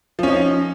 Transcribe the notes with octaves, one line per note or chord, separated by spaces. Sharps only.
F3 C#4 D#4